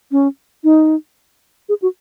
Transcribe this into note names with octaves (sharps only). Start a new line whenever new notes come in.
C#4
D#4
G#4
F#4